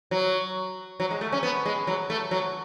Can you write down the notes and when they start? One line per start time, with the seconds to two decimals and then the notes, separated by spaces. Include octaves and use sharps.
0.11 F#3
1.00 F#3
1.11 G#3
1.21 A3
1.32 C#4
1.43 B3
1.66 G#3
1.87 F#3
2.10 A3
2.31 F#3